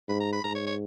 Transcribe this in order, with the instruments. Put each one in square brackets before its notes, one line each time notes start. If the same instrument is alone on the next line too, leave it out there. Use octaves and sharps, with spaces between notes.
[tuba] G#2 [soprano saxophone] B5
[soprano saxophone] A#5
B5
[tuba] G#2 [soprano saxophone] A#5
[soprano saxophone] C#5
C#5